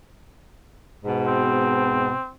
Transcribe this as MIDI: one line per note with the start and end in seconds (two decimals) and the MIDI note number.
1.05 2.11 44
1.05 2.11 47
1.27 2.31 60